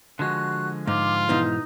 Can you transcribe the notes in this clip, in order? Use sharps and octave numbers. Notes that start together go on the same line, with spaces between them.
D3 F3 G#3 F#4 F#6
G#2 F4 D6
G#2 B2 E3 D#4